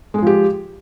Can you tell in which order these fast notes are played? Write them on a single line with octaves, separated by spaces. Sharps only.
G#3 G#4 F3 G4